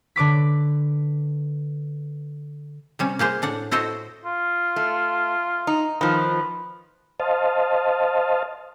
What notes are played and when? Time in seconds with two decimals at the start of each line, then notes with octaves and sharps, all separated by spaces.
0.16 D3 B4 D6 B6
2.99 C3 G3 C#4
3.19 A#3 G4 G#4 C5
3.42 A2 D4 F#5
3.71 E4 F#4 A4 C5 D#5 E5
4.25 F4
4.76 A3
5.67 D#4
6.01 D#3 F3 B4
7.20 C5 D#5 F5 A5